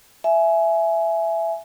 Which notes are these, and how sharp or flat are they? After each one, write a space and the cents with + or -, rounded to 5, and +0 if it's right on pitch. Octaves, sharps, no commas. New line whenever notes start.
E5 +10 G#5 +20